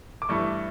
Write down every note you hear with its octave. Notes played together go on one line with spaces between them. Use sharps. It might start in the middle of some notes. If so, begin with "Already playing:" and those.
D6
G2 E3 A3 C#6